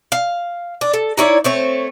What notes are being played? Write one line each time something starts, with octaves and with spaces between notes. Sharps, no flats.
F5
D4
A4
D#4 E4 C#5 D5
A3 C4 C#5